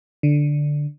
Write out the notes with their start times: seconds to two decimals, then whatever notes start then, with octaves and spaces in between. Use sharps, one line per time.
0.23 D3